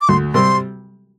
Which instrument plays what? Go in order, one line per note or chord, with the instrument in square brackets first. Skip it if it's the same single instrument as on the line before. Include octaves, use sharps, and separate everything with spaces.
[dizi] D6
[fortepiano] D2 [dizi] C6
[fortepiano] C3 G3 C4 G4 [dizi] C6